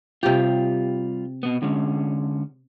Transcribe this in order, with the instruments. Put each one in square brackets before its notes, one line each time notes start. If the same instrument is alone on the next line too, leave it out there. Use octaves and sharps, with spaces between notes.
[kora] C3 G4 [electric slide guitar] G3 F4
[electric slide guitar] B2 B3
D3 G#3 C#4